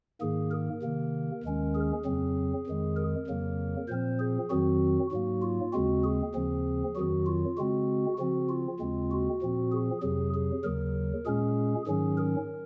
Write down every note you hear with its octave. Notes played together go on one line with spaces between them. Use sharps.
G#2 D#3 A#3 G#4
A#4
C3 D#3 A#3
D#2 D#3 G#3 C#4
G#4
F2 C#3 F#3 C4
F2 D#3 G#3
A#4
F2 C#3 F#3 A#3
A#2 F3 C4 C5
G#4
F2 D#3 F#3 C4 F#4
G#2 F#3 A#3 F#4
F4
D#2 C#3 G#3 C4 F#4
G#4
D#2 C#3 F3 C4
F2 D#3 F#3 F#4
F4
C#3 G#3 C4 F#4
C#3 F3 C4 F#4
F4
D#2 C#3 G#3 C4
F#4
A#2 F3 C4
G#4
F2 C3 F#3 G#4
G#4
D#2 C#3 F#3 A#4
A#2 G#3 C#4 G#4
G#2 D#3 F#3 C#4 G#4
A#4